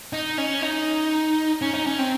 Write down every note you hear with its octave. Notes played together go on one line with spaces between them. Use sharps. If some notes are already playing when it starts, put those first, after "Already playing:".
D#4
C#4
D#4
C#4
D#4
C#4
C4